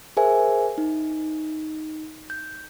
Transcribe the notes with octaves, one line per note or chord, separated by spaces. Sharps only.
G#4 A#4 C5 E5 G#5
D#4
G6